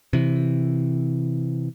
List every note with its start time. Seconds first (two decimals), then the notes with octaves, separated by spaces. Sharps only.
0.13 C3 E3